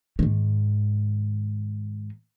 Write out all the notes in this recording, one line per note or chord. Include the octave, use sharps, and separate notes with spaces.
G#2 D#3